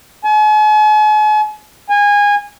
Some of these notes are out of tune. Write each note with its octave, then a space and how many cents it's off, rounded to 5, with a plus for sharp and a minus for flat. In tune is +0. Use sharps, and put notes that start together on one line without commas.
G#5 +45
G#5 -20